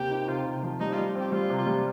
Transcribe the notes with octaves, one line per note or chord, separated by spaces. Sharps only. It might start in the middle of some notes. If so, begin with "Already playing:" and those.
Already playing: D#2 C3 A#3 G4
D#4
C3 F4
C3
F3
G3 D#4
G3 F4
C4 G4
G3 F4
C3
F4
G3